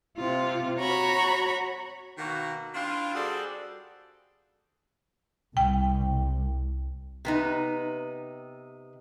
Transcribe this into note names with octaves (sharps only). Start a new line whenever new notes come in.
C3 F4
F#4 C#5 A#5 B5 C#6
B2 D#3 A#3 F#4
C4 D4 E4 F4
G3 F#4 G#4 A4 C5 D5
C2 G5
C3 B3 D#4